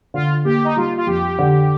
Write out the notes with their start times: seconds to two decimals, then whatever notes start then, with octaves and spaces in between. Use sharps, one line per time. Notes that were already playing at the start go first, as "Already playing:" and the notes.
0.14 D3 F4
0.45 A#3 G4
0.65 D#4
0.76 G3 F4
0.97 F4
1.07 F2 G4
1.39 D3